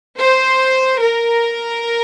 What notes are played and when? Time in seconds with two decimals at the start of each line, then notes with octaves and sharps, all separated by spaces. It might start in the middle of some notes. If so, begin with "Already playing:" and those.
0.19 C5
1.01 A#4